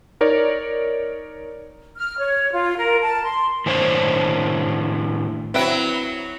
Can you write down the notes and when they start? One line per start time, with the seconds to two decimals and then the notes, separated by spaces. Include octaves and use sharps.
0.21 D#4 A#4 C#5 D5
1.97 F6
2.19 C#5
2.53 F4
2.77 A#4
3.01 A5
3.24 C6
3.66 A2 D#3 D4 C5 C#5
5.54 F#3 C4 E4 B4 G5